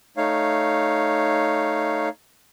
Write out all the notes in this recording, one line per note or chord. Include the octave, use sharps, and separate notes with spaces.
A3 D#4 C#5 F5